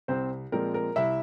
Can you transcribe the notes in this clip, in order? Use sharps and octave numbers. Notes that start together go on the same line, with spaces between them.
C2 C4 C5
A#2 F3 G#3 C4 A#4
A#4
C2 E4 E5